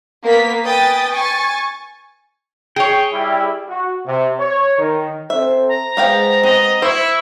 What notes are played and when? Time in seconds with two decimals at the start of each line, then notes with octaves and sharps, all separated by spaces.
0.24 A#3 B3 A#4 B6
0.63 B4 G5 G#5 D#6 A6
1.11 G#5 C#6 A6
2.76 G#4 C#5 G5
3.13 G3 E4
3.68 F#4
4.06 C3
4.39 C#5
4.78 D#3
5.30 C4 A4 C5 E5
5.68 A#5
5.97 G#3 B3 C5 F5 G5
6.43 B3 C4 D#5
6.82 E4 C5 C#6